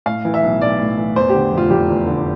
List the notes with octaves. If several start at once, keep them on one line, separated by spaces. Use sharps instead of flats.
A2 F5
E3
E5
B1
B1 D5
A2
E3
E2 C5
G4
D3
F1
F4
F1 G4
E2
D3